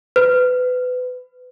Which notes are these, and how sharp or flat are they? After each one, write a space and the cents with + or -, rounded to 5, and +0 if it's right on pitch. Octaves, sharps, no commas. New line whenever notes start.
B4 +25